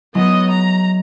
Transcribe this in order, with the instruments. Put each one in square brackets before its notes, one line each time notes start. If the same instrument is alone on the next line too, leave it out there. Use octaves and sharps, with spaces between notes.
[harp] F#3 G#3 E4 [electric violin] B3 D#5
[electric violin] A#5